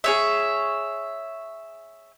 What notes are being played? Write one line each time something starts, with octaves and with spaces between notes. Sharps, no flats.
G#4 C#5 E5